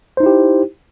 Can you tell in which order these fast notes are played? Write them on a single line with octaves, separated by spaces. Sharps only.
C5 D#4 E4 G4